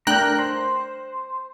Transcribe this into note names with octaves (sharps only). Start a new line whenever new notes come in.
A3 D4 A#4 G5 A#5 F#6
C5